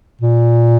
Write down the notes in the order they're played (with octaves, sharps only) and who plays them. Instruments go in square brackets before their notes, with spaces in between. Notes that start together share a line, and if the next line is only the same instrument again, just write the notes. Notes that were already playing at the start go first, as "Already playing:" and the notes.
[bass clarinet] A#2